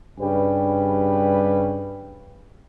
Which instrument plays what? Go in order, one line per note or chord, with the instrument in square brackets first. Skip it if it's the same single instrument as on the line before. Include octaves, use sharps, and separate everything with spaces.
[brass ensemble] G2 C#3 G3 B4 G5